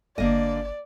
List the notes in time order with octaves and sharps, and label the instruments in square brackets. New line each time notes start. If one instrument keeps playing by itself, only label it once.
[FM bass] G1 [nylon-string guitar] D3 A#3 D#5 [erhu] D5